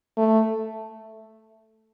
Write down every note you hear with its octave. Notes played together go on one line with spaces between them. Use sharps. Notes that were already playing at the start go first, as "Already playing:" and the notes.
A3